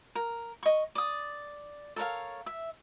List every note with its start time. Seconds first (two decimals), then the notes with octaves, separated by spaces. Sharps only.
0.15 A#4
0.63 D#5 C#6
0.95 D5 D#6
1.96 A4 A#4 C#5 F5
2.46 E5